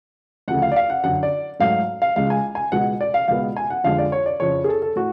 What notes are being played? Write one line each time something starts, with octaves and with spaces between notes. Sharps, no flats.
D2 C#3 F3 A3 F#5
F5
D5
F5
F#5
F#2 D3 F#3 F#5
D5
G#2 F#3 A3 F5
F5
C#2 C#3 G#3 F5
G#5
G#5
C#2 B2 G#3 B3 F#5
D5
F5
C#2 B2 G#3 B3 F5
G#5
F#5
F2 D3 F3 G#3 F5
D5
C#5
D5
F2 C#3 F3 C#5
G#4
A4
A4
A2 F#4